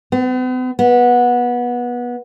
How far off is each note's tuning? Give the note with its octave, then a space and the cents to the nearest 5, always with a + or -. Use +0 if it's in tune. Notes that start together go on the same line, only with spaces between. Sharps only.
B3 +45
B3 -20